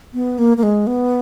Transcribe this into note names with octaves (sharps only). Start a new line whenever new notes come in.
B3
A#3
A#3
G#3
B3